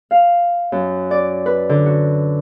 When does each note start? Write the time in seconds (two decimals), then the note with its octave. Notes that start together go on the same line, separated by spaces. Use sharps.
0.11 F5
0.72 F#2
1.11 D5
1.46 B4
1.69 D3
1.86 F#4